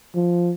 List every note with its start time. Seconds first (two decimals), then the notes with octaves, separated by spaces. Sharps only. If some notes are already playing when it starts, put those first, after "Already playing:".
0.15 F3